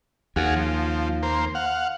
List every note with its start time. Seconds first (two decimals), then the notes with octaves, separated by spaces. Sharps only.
0.36 D#2 F#4 G#4 F5
0.56 F3
1.23 A#3 C5
1.55 F5 F#5